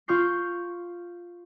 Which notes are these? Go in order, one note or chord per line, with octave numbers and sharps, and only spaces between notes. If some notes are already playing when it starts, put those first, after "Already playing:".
F4 C#6 F6 G6 C7